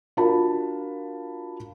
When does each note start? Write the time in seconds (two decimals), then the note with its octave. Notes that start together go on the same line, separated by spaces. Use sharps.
0.17 D4 F4 F#4 A#4 A5 B5